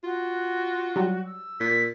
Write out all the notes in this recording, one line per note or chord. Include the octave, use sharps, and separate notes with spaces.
F4 F#4
F#3 G3
E6
A#2 B6